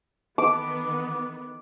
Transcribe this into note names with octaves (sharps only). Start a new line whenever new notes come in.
D#3 E3 B3 D6